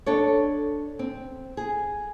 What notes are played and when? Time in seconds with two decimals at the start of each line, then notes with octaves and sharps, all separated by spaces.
0.06 D4 A4 C#5
0.99 C4
1.57 G#4